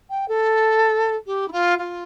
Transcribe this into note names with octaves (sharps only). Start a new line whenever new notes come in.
G5
A4
G4
E4
F4
F4